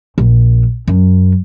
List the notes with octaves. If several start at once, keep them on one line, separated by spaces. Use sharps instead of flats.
A#1
F#2